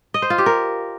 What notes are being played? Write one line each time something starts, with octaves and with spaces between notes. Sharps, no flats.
D#5
C5
F4
G4
A#4